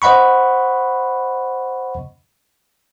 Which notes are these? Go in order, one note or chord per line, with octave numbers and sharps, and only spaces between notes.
C5 D#5 F#5 B5 C#6